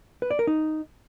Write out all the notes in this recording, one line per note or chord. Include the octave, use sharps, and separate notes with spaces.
B4
D5
A#4
D#4